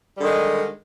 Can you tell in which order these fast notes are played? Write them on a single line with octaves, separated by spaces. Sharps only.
G3 D3 D#3 G#3